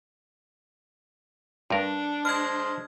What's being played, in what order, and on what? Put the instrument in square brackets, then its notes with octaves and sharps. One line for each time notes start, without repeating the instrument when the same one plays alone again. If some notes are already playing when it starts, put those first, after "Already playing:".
[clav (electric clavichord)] G2 A#4 [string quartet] D4
[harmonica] C5 D#5 [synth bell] F6 G#6